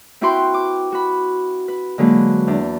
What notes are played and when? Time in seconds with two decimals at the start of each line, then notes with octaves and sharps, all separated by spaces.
0.21 C4 E4 F#4 B4 G5 C6
0.54 D6
0.92 F#4 B5
1.68 B4
1.98 D3 F#3 G#3 A#3 F#4 B4
2.47 E2 D4